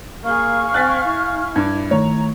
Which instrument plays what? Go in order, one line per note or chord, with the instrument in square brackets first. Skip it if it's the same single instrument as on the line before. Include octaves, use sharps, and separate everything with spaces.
[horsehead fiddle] A#3 G#4 [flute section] F5 C#6 F6
[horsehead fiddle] C4 [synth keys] G#5 G#6 [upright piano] F#6 A6 B6
[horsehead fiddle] E4
[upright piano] G2 [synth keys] D6 G#6
[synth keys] D#3 A3 [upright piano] C#5 [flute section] A#5